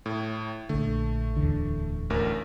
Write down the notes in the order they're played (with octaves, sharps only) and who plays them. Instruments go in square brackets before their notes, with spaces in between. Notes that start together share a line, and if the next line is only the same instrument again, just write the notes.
[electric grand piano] A2
[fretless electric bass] A#1 D3 [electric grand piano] A3
[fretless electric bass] D1 E2 D3
[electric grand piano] A1 D2 A#4